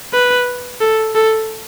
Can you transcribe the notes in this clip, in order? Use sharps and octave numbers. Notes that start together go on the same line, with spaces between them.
B4
A4
A4